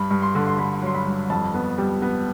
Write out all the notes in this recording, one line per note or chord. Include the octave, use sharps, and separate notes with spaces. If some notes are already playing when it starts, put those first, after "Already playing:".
Already playing: G2 B5
G2
C6
D3
C6
D3 B5
F#3 C6
B5
G2
F2 A5
B3
G3
B3